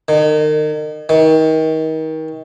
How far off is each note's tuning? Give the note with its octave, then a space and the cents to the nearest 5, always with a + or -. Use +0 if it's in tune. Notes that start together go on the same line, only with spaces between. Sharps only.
D#3 -35
D#3 +30